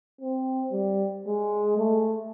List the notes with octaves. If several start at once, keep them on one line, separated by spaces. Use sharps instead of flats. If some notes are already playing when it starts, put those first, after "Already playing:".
C4
G3
G#3
A3